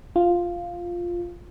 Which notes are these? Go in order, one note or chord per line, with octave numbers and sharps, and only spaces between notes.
F4